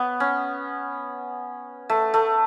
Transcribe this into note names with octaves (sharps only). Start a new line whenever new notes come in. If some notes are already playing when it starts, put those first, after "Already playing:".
Already playing: B3 C#5
C#4
A3
A3